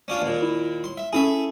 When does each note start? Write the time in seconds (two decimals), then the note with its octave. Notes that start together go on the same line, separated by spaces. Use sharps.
0.08 C#4 D4 F4
0.22 D#2 A#2
0.42 E4
0.84 C6
0.97 E5
1.13 C#4 E4 G#4 A4 E5 G#5